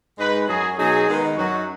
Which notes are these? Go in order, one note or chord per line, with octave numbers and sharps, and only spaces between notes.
G#2 G#3 D#4 B4
F#2 F#3 C#4 G#4
B2 F#3 D#4 G#4
D#3 G#3 B3 D#4
F#2 F#3 D#4 F#4